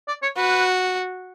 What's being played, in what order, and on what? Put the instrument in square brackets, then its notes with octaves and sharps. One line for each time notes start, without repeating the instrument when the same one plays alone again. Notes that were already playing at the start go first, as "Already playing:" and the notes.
[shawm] D5
C#5
[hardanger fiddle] F#4 [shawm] B4